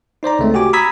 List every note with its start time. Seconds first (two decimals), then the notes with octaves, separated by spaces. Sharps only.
0.23 D#4 C5 D5 A#5
0.39 C#2 A3 C4
0.54 F#4 G4 G#5 D6
0.73 A#5 B5 D#6 E6 G#6 B6